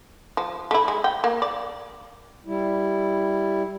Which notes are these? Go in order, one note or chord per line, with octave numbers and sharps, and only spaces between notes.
F3
A3 E4
G#3
G5
A#3
D5
G3 E4